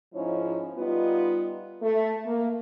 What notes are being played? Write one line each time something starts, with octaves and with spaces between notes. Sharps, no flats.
G#2 F3 C#4 D#4 E4 C#5
G3 B3 D#4 F4
A3
A#3